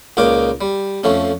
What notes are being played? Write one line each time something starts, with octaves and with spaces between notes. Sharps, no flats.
C#2 A#2 D#4 F5 D6
G3
F2 F3 A3 C#4